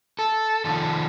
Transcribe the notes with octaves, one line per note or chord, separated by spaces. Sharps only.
A4
D#3 F3 A4